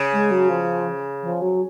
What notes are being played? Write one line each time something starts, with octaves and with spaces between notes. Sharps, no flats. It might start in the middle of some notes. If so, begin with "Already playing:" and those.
Already playing: C#3
G#3
F#3
F3
F3
F#3